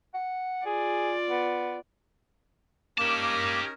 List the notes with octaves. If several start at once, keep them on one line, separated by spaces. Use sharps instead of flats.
F#5
F4 G#4 D5
B3
A#3 C#4 D#4 G4 A#4 A5 D6